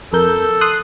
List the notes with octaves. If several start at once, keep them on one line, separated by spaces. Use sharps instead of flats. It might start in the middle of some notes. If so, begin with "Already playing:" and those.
F2 A4 A#4 G6
C6 D#6 F#6